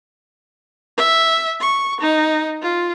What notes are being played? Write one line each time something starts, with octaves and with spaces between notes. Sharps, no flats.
E5
C#6
D#4
F4